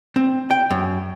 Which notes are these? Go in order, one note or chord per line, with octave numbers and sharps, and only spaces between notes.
C4
G5
F#2